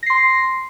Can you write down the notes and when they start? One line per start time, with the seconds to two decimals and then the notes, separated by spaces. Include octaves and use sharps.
0.03 A#6
0.06 C7
0.10 C6